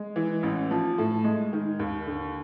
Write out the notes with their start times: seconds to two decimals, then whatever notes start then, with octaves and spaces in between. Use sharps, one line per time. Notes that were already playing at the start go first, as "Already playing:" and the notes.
Already playing: G#3
0.16 E3
0.43 A1
0.71 F3
0.98 A2
1.24 G#3
1.53 D#3
1.79 D#2
2.06 D3